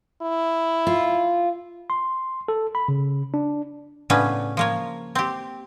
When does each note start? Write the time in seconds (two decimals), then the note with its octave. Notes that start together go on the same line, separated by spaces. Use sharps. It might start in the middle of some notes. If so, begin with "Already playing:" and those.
0.22 E4
0.87 F4
1.90 C6
2.48 A4
2.75 B5
2.88 C#3
3.34 D4
4.10 A2 C#3 B3 C#4 D4 B4
4.57 F3 A#3 C#5
5.15 C4 G4